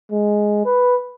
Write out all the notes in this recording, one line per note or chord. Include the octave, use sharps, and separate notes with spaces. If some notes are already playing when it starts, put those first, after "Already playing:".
G#3
B4